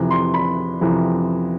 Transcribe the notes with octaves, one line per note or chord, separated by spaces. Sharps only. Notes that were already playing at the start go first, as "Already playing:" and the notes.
Already playing: F2 C3 E3
C6
B5
F2 C3 E3